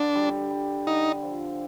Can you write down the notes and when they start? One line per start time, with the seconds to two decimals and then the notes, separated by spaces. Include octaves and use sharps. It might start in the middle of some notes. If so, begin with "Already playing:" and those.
Already playing: D3 D4
0.15 G3
0.51 G3
0.87 D3 D#4
1.23 F3